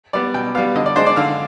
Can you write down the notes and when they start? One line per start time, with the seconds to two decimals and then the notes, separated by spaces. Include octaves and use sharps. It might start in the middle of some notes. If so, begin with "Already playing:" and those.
0.13 G3 B3 D5
0.34 B2 G5
0.55 G3 B3 F5
0.76 D3 D#5
0.86 D5
0.96 G#3 D4 C5
1.07 D5
1.16 D3 F5